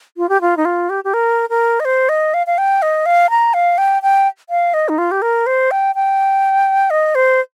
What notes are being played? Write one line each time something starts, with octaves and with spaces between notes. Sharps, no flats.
F4
G4
F4
D#4
F4
G4
G4
A#4
A#4
D#5
C5
D#5
F5
F5
G5
D#5
F5
A#5
F5
G5
G5
F5
D#5
D#4
F4
G4
A#4
C5
G5
G5
D#5
C5